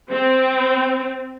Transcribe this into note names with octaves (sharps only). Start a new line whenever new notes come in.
C4